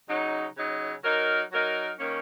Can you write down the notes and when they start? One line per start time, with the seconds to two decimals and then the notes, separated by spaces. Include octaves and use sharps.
0.07 C#3 F#3 D#4
0.55 C#3 F#3 D#4
1.03 F#3 D#4 A#4
1.51 F#3 D#4 A#4
1.98 D#3 A#3 C#4